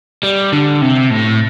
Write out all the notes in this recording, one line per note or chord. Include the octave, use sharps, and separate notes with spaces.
G3
D3
C3
A2